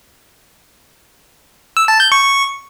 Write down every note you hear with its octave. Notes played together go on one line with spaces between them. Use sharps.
E6
A5
G6
C#6